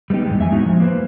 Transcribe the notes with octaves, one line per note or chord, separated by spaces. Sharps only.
G3 A3 B3 D#4 G4
G#2 E3 G3 G#3
F2 E5 G#5
A2 G#3 B3 D#4 F#4
F3
A#3 B4 C5